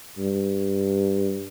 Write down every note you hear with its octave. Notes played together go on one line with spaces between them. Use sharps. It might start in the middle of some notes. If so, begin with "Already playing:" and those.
G2